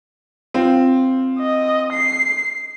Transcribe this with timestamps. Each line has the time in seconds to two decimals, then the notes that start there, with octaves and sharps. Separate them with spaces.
0.54 C4 F4
1.40 D#5
1.93 C7